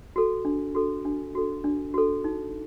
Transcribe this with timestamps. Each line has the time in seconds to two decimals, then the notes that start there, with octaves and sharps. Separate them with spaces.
0.16 F#4 A4
0.45 D4
0.75 F#4 A4
1.05 D4
1.35 F#4 A4
1.64 D4
1.94 F#4 A4
2.24 D#4